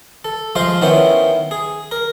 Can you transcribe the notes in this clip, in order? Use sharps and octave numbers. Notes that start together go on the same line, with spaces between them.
A4
F3 G#3 F4 C5 F5
D#3 B3 C#4 E4 C5
G#4
A#4